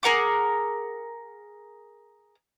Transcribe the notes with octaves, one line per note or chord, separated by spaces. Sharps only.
G#4 A#4 F#5 D6